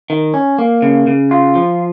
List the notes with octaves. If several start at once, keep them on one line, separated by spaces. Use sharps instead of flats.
D#3
C#4
A#3
C#3
C#3
F4
F3